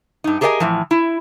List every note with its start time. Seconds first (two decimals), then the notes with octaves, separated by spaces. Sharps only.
0.24 G2 D#4
0.41 G4 G#4 A#4 C#5 D#5 G#5
0.60 A2 E3 F3
0.91 E4